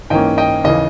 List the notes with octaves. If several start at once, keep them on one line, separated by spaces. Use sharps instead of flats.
G#2 E3 A#3 C#4 D#5 G5
D#5 G5
D#2 C#3 E3 D#5